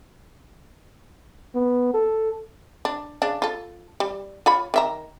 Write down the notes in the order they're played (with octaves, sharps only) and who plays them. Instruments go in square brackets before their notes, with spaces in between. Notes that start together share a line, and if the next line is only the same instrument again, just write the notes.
[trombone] B3
A4
[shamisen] D4
C#3 D4
F4 A4
G3
F4 C#5 B5
D#3 E5 A#5